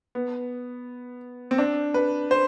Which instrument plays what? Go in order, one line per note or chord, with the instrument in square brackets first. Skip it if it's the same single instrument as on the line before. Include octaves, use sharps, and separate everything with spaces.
[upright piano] B3
C4
D4
B4
C5